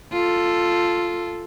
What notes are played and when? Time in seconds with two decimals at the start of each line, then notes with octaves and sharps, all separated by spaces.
0.12 F4 A4